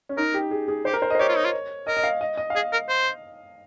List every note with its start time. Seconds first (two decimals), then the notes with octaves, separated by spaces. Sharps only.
0.09 C#4
0.17 D#4 A#4
0.34 G4
0.51 G#4
0.68 G#4
0.85 G4 C5
0.94 A#4
1.02 C5
1.10 D#5
1.15 C5
1.19 G4 C#5
1.28 F4
1.37 D#4
1.45 F4
1.87 A#4 D#5
1.97 D#5
2.04 F5
2.21 D#5
2.37 D#5
2.50 F5
2.55 G#4 D#5
2.73 A#4
2.89 C5